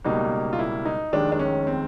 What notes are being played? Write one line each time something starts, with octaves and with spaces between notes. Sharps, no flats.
C#2 B2 G3 A#3 D#4
F4
E4
D#4
F1 D#2 D#3 G#3 D4
D4
C#4
C4